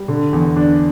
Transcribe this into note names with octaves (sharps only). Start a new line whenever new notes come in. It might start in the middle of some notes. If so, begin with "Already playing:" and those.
Already playing: G3
D3
E2
D4